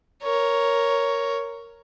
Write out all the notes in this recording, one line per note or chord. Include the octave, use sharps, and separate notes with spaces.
A#4 C#5